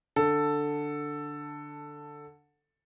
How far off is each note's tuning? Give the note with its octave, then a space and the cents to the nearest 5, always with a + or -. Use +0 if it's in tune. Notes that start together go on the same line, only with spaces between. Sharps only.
D3 +0 A4 +10